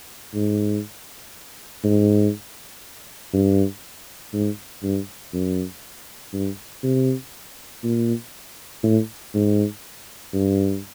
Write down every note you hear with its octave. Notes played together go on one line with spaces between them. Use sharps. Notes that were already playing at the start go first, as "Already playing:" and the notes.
G#2
G#2
G2
G#2
G2
F#2
G2
C3
A#2
A2
G#2
G2